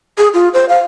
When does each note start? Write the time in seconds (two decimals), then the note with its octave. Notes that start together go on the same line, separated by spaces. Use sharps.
0.18 G#4
0.34 F4
0.54 C5
0.69 F5